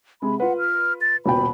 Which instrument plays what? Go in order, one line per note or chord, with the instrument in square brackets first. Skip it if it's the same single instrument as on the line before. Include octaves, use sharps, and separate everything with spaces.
[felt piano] C3 G#3 [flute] B5
[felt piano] F4 B4 [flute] F#5
[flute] F6
A6
[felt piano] D#1 B2 G5 [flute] B5